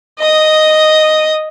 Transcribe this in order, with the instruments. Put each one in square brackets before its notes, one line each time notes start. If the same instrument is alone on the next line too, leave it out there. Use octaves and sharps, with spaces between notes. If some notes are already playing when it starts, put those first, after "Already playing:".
[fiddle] D#5 D#6